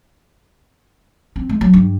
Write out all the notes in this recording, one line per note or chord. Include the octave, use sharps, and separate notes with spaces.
C4
G#3
F#3
G2